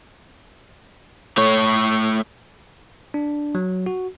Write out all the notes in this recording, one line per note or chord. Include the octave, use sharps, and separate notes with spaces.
A3 C#5
D4
F#3
F#4